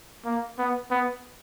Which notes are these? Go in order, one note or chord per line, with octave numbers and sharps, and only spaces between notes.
A#3
B3
B3